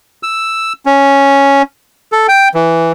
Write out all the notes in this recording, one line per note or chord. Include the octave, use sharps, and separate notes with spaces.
E6
C#4
A4
G5
E3